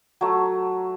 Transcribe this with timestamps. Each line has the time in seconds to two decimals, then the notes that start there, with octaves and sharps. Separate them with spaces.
0.21 F#3 A3